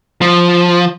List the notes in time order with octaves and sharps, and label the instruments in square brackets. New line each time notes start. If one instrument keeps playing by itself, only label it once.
[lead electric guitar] F3